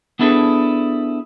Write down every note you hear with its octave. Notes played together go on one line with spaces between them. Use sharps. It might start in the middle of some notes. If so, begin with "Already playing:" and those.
B3 D4 E4 G#4 A4 B4